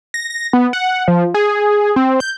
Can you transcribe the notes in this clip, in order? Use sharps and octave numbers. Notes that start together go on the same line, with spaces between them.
A#6
A#6
B3
F#5
F3
G#4
C4
G6